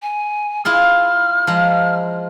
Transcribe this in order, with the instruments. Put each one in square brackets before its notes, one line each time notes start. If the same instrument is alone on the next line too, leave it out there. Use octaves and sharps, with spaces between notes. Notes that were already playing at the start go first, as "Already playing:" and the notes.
[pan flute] G#5
[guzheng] E4 F4 G#4 [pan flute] F6
[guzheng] F3 G#3 A#5